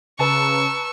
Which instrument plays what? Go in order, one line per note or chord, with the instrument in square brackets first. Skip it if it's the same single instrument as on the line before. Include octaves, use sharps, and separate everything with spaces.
[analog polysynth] C#3 [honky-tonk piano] B4 A5 A#5 [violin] C#6 E6